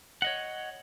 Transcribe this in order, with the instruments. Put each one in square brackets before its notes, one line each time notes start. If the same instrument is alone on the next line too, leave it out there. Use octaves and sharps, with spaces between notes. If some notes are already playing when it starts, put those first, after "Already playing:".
[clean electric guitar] C#5 D#5 F#5